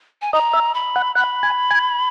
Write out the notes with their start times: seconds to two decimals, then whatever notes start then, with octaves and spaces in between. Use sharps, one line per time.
0.22 G#5
0.33 D#5 A#5
0.53 E5
0.74 B5
0.96 F#5
1.15 F#5 B5
1.43 G#5
1.71 G#5